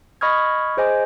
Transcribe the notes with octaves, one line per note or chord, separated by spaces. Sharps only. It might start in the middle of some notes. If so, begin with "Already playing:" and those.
D#5 B5 C#6 D#6 F6 G#6
G#4 C5 D#5 G#5 D6